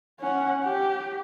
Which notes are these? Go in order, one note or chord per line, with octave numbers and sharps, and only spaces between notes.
C#4 F#5
G4